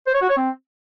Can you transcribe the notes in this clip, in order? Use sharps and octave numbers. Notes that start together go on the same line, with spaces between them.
C5
C#5
F#4
C#5
C4